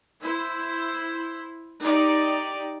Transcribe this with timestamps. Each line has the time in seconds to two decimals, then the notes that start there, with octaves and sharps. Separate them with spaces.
0.21 E4 C5
1.81 D#4 G4 D5